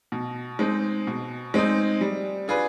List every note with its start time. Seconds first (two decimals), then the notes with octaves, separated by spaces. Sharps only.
0.12 B2
0.59 G#3 C4 D#4
1.07 B2
1.54 G#3 C4 D#4
2.01 G3
2.48 D4 F4 G#4 B4